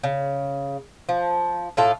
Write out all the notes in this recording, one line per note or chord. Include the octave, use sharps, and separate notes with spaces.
C#3
F3
A2 F4 A4